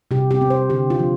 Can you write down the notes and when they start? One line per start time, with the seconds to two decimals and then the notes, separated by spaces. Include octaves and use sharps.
0.11 C3 G4
0.31 G4
0.41 C4
0.50 C5
0.70 D3 G4
0.90 F4
0.99 F3